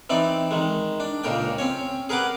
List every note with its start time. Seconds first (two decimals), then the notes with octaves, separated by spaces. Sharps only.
0.10 E3 C4 D#4 D5
0.51 D#3 G#3
1.00 D4
1.24 C#2 A#2 C#3 A#4 G5
1.58 C4 C#4 C#5
2.09 G#4 A#4 B4 F#5 D6